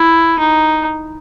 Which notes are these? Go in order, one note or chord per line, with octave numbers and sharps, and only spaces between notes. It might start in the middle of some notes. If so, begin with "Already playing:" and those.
Already playing: E4
D#4